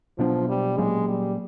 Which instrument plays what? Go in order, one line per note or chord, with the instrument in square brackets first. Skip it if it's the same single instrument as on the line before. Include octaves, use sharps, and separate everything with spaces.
[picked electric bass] B2 F#3 B3 D4 [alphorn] F3
[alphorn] G3
[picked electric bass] A#2 F#3 A#3 C#4 [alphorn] G#3
[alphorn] G3